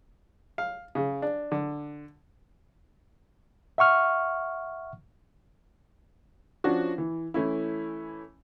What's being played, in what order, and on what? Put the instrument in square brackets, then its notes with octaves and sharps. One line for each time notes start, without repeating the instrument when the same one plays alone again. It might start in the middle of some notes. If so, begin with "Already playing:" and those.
[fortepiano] F5
C#3
D4
D3
[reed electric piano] E5 F#5 C#6 F6
[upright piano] F3 C#4 D4 F#4
E3
E3 A3 C#4 E4